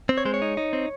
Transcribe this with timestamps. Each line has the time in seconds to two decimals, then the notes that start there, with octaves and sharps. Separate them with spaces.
0.09 C4
0.18 C#5
0.25 G#3 C5
0.34 C#5
0.42 D#4
0.57 D#4
0.73 C4